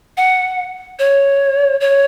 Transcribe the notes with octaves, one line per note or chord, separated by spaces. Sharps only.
F#5
C#5
C#5